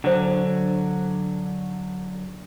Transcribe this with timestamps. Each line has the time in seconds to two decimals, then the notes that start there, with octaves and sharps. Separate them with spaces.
0.04 D3 F#3 D4 C5